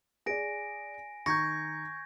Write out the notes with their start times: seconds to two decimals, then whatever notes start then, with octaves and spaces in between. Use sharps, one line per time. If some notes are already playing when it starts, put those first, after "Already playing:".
0.26 G#4 D5 G#5 A#6 D7
1.26 D#3 A#5 C#6 G6 G#6 A#6